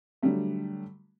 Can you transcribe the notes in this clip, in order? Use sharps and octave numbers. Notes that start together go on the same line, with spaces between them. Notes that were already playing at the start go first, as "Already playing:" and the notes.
D3 F#3 G3 A3